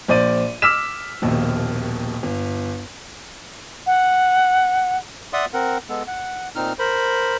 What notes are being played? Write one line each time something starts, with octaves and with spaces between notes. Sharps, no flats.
A#1 C5 D5 D#7
D6 E6 F6 B6 E7
D#1 A#1 D#2 B2
G1
F#5
D5 E5 F#5 C6 D#6
C4 A#4 F#5
G#3 B3 A4
F#5
A#2 C4 D#4 F6
A#4 C5 B5